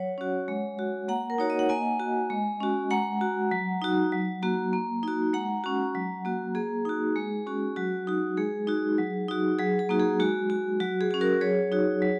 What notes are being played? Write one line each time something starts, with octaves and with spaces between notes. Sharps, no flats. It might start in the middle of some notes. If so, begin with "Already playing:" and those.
Already playing: F#3 C#5 F#5
C#4 F#4
G#3
F#4
A#3 F#5 A#5
A#4
D#4 F#4 C#5
D#5
F#5
A#3 D#5 G#5
F#4
G#3
C#4 F#4
G#3 F#5 A#5
F#4
F#3
D#4 F#4
F#3
A#3 F#4
A#3
D#4 F#4
G#3 F#5 A#5
C#4 F#4
F#3
A#3 F#4
A#3 G#4
D#4 F#4
G#3
C#4 F#4
F#3 F#4
D#4 F#4
G#3 G#4
D#4 F#4
F#3
D#4 F#4
F#3 G#4
G#4
A#3 D#4 F#4
G#4
G#3 F#4
F#4
F#3 F#4
G#4
F#4
C#4
F#4 A#4
F#3 G#4 C#5
D#4 F#4
F#3